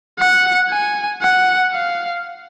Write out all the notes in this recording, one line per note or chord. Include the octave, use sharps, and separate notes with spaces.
F#5
G#5
F#5
F5